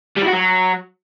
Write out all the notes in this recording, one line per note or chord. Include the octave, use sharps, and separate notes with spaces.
G3
E4
F#4
F#3